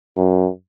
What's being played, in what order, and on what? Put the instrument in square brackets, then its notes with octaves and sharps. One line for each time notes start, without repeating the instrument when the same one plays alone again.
[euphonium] F#2